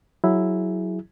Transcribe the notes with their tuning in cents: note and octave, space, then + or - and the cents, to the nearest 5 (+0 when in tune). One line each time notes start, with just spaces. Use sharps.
F#3 +0 E4 +0 G#4 +5